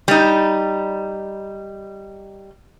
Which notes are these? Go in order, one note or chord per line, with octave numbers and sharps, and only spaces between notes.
G3 D#4